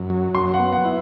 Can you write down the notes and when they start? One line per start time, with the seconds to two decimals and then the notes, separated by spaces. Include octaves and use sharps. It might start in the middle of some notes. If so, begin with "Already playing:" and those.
Already playing: F#2
0.10 F#3
0.34 F#2 C6
0.54 F#5
0.60 B3
0.73 F#5
0.85 E4